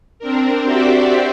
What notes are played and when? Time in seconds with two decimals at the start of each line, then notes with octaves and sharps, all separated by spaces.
0.19 C4 D4 A#4
0.64 F#4 G4 C5 D5 E5